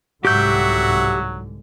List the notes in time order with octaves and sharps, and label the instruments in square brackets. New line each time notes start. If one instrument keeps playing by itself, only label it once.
[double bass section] C2 G#2 D3 [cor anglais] F#3 [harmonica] F#4 E5 [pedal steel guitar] G4 G6